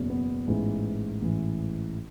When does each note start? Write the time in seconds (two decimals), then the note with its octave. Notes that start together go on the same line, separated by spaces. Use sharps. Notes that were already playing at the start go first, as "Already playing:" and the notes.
Already playing: F#1 E2 B2
0.10 B3
0.47 A1 G#2 E3
1.22 A1 G#2 E3